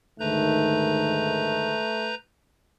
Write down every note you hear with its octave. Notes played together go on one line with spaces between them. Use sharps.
D2 G#2 D#3 A3 B4 A#5 G6